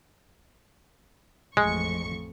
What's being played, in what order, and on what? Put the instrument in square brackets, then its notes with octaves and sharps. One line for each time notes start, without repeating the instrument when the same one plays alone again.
[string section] A1 F2 C#6 [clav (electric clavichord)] G#3